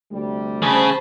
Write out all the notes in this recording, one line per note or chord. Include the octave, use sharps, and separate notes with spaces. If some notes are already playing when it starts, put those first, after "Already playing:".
D2 C3 G3
C#3 G#4 C5 A5 B5